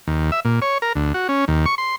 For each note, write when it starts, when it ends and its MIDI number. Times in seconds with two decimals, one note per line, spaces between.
0.08 0.31 39
0.32 0.40 76
0.45 0.60 46
0.62 0.78 73
0.82 0.93 70
0.95 1.13 38
1.14 1.28 66
1.29 1.45 61
1.48 1.66 39
1.66 1.75 85
1.78 1.96 84